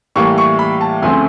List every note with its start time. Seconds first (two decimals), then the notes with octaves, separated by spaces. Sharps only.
0.16 A2 E3 G3 A#3 C#6
0.38 C#6
0.59 B5
0.81 A5
1.02 D2 C#3 F3 A3 C4 G#5